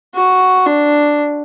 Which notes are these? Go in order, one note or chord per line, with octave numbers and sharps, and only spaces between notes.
F#4
D4